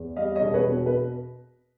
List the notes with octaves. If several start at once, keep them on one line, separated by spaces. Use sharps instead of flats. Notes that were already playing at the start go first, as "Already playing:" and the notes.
Already playing: E2
G3 D#5 F5
C#5 D#5
E1
B4 C#5
B2
B4